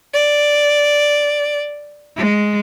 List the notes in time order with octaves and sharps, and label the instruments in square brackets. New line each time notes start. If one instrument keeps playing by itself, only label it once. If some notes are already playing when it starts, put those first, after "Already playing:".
[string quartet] D5
G#3